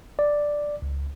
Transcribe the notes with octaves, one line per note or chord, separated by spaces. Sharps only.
D5
C#2